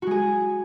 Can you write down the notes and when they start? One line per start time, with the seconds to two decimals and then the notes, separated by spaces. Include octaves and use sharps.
0.02 F#4
0.07 G#3
0.11 G#4